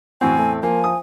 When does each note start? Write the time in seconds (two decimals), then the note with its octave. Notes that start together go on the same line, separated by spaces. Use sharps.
0.21 E2 A2 C4 F#4 G#5
0.39 A3
0.63 F3 A#3 G#5
0.84 D#6